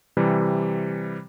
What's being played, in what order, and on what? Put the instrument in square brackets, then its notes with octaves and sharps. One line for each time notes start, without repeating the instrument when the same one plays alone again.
[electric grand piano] C3 E3 G3